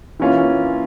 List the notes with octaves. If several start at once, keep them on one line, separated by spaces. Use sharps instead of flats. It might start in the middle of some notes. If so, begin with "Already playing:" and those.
E3 A#3 C#4 F4